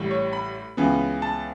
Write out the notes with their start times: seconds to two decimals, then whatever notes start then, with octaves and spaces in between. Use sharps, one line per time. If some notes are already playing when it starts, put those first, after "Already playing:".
Already playing: A1 A2 G3
0.11 C#5
0.33 B5
0.77 C#2 C#3 E3 B3
1.22 A5